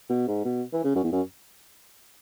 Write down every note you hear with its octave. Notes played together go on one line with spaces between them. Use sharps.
B2
G#2
B2
E3
C#3
F#2
E2
F#2